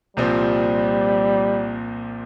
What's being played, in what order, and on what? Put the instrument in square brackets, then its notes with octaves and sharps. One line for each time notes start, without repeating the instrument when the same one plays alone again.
[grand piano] C2 A#2 F3 C4 [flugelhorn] G3